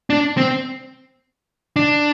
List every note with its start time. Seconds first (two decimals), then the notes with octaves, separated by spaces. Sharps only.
0.10 D4
0.37 C4
1.76 D4